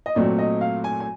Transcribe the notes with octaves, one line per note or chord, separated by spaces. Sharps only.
D#5
A#2 F#3 A3 C4 D5
D#5
F5
G#5
G#5